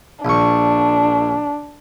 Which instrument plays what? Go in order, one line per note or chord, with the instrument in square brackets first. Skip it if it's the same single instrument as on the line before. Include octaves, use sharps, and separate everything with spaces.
[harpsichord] A#1 C#6 [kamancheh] D4